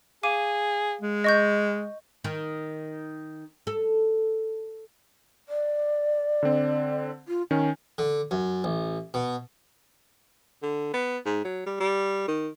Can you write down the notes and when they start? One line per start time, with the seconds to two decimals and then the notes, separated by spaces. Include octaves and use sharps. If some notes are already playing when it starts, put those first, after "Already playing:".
0.23 G#4 F5 D6 D#7
1.01 G#3
1.24 D#5 C#6 G6
2.24 D#3
3.67 A4
5.49 D5
6.43 D3 C4
7.28 F4
7.51 D#3 C#4 G#5
7.98 D3
8.31 F#2
8.64 A1
9.14 B2
10.63 D3
10.94 B3
11.26 G#2
11.44 F#3
11.66 G3
11.80 G3
12.28 D#3